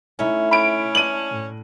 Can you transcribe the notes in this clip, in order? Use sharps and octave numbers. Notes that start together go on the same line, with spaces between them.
A3 C#4 D#4 E4
C#4 B5 D7
D4 D#7 F#7
A2